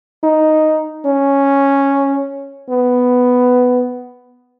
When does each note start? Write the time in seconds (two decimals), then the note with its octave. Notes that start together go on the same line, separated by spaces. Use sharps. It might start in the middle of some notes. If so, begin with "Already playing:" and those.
0.24 D#4
1.05 C#4
2.69 B3